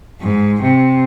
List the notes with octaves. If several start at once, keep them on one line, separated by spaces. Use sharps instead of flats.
G#2
C3